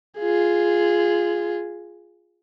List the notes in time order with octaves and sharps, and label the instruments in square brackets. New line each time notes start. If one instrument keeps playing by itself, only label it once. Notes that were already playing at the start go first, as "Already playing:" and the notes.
[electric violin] F4 G#4